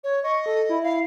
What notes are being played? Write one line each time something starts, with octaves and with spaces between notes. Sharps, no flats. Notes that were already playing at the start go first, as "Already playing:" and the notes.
C#5
D#5 C#6
A4
E4
F5